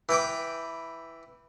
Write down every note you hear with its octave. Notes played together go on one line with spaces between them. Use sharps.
E3 B4 G5 D6